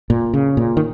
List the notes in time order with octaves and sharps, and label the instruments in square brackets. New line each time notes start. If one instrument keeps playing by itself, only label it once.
[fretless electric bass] A#2
C#3
A#2
D#3